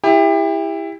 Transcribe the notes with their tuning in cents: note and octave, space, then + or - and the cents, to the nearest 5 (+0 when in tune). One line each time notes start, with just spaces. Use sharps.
E4 +0 G4 +30